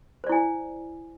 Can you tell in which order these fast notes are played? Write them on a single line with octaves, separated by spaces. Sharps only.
C5 D5 E4 G#5